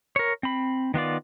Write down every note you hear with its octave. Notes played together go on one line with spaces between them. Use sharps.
A#4 C#5
C4 B5
D#3 B3 F4 D5